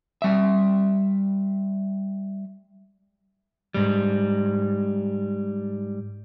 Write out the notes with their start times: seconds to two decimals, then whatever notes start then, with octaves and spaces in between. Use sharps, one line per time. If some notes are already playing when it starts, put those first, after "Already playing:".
0.22 G3 E5
3.74 G#2 G3